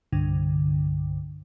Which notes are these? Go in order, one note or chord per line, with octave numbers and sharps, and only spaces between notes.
C2 G2 D3